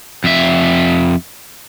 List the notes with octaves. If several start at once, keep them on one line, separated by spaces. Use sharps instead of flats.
F2 E5